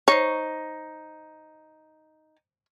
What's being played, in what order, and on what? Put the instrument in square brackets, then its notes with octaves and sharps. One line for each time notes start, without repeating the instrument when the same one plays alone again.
[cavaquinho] D#4 [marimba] C5 C#6 [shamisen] C#5